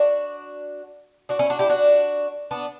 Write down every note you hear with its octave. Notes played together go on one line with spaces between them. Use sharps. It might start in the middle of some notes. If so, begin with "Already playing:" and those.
Already playing: D4 F#4
D4 F#4
C#4 E4
D4 F#4
E4 G4
D4 F#4
B3 D4